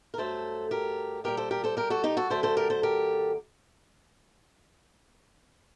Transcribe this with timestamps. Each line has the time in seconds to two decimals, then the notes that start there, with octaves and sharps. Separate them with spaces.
0.14 A#4
0.17 G2 F#3 A3 A4 C5
0.71 G4 A#4
1.24 A#2 G3 G4 A#4
1.37 A4 C5
1.51 G4 A#4
1.64 A4 C5
1.77 G4 A#4
1.90 F#4 A4
2.04 D#4 G4
2.17 F#4 A4
2.30 F#2 D3 A3 A4 C5
2.43 A4 C5
2.57 G4 A#4
2.70 A4 C5
2.83 G4 A#4